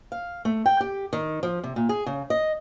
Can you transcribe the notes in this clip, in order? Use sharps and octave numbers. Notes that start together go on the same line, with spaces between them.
F5
A3
G5
G4
D#3
F3
C3
A#2
G#4
C#3
D#5